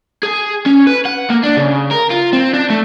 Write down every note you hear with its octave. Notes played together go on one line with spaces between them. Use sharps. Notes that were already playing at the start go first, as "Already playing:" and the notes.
G#4
C#4
B4
F#5
A#3
D4
C#3
A#4
F4
C4
D4
A3